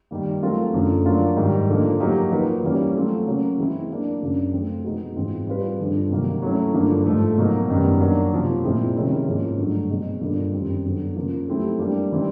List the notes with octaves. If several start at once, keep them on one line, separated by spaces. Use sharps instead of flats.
D#3 G3 A#3
F#3 A3 C4 F4 A#4
F#2 D3 F3 A3
F#3 A#3 D4 F4
G#2 D#3 G3
D3 F3 A#3
F#3 A#3 D#4 G4
F3 A#3 D#4 F#4 B4
E3 G3 A#3 C#4
F#3 A3 C4 F4
C#3 F#3 A#3 C#4
E3 G#3 C4 E4
F#3 A#3 D4
F#2 C#3 F#3 A#3 D4
F3 A3 C4 F4
B2 G#3 B3 D#4 F#4
G#2 E3 G#3 C4 F4
G3 C4 F4 G#4 B4
G2 D3 F3
C3 D#3 F#3 A#3
F#3 A3 C#4 E4
G2 D3 F3 A#3
G#2 F3 A3
B2 F#3 A#3 D#4
F#2 D#3 G3 B3
F#3 A#3 D4
C3 F3 A#3
A#2 F3 G#3 C4 E4
C3 D#3 G#3 C#4 E4
G#2 F3 A#3 C#4
G2 D3 F#3 A3
B2 G#3 C4
G2 D3 F3 A#3
F#2 D#3 G3 C4
D3 F#3 B3
C#3 F3 A#3
F#3 A3 C4 E4 G4
G3 A#3 D4 G4
E3 G3 C4 D#4